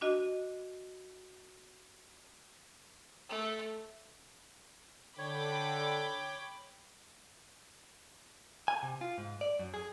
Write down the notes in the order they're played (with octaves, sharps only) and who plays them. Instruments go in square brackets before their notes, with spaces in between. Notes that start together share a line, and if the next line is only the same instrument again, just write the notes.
[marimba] D4 F#4 D#5
[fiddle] A3
[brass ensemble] D3 [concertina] C#5 [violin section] G5 B5 D6
[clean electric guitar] G#5
C3
F4
G#2
D5
F#2
G#4